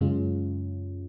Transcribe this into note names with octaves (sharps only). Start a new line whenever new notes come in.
F#2 C#3 G#3 C#4 F4